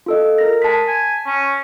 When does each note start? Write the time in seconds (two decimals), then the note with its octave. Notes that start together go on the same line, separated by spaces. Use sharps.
0.06 F4 A4 D#5
0.38 A#4 A#6
0.62 G#3 A5 B6
0.86 G#5
1.26 C#4